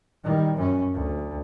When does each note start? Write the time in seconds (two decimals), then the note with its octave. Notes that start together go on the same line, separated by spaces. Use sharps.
0.24 D#3 G3
0.57 F#2 C#4
0.94 D2